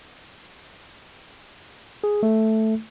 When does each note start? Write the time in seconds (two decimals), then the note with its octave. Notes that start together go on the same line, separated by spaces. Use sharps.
2.04 G#4
2.23 A3